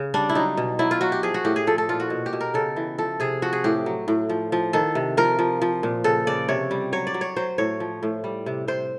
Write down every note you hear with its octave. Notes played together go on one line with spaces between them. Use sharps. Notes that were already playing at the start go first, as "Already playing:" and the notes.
Already playing: C#3
G3 D4
E4
F#3 D#4
B2
F#3 E4
F4
F#3 F#4
G4
F3 G#4
F#4
A2 G4
G#4
F3 A4
A4
A#2 F4
F#4
B2
G4
B2
A#4
C#3 A4
E3
F3 A4
C3 G#4
F3 F#4
G#4
A2 G4
F#3
A2
F3
F3
D#3 A4
C3
F3 A#4
F3
F3
A#2
C#3 A4
C#3 D5
C3 C#5
G3
F#3 C#5
D5
F#3
C#5
F#3 C5
A2 C#5
F3
A2
G3
C3
C3 C5